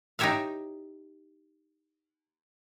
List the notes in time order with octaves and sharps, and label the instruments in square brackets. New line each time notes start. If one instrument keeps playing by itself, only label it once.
[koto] D#4 E4 G4 C#5 E5 F5